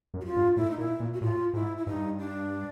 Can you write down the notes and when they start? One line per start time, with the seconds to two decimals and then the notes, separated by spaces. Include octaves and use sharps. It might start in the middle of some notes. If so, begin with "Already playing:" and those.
0.14 F#2
0.21 F#4
0.25 F4
0.36 G2
0.57 A2 E4
0.71 D#4
0.78 A#2 E4
1.00 A#2
1.14 F#4
1.21 A2 F4
1.54 G#2 E4
1.77 E4
1.87 G2 D#4
2.19 D4